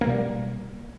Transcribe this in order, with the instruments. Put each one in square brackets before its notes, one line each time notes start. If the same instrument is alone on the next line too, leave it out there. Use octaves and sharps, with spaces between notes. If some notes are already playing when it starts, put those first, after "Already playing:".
[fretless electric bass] A#3
A3
B2
G3